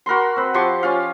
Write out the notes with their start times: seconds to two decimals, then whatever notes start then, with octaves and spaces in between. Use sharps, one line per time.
0.06 F#4 A#4 B5 C6
0.36 C4 B4
0.54 F3 G4 C6 C#6
0.83 C#4 F4 F5